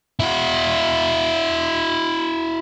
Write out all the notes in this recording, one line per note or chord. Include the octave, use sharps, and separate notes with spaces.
E4 F#4